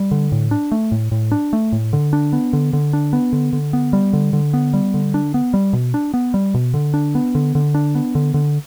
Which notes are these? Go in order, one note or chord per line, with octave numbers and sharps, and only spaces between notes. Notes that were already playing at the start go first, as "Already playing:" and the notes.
Already playing: G3
D3
A2
D4
A3
A2
A2
D4
A3
A2
D3
D4
B3
D3
D3
D4
B3
D3
D3
B3
G3
D3
D3
B3
G3
D3
D4
B3
G3
B2
D4
B3
G3
B2
D3
D4
B3
D3
D3
D4
B3
D3
D3